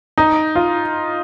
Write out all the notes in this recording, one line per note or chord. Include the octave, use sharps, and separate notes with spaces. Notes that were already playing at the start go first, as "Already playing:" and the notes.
D#4
F4